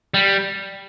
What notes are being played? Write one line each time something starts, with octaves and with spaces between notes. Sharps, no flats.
G3